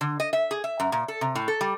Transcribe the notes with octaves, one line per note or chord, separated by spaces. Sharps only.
D3
D#5
E5
G#4
E5
F#2
A#2
A4
C3
A2
A4
G3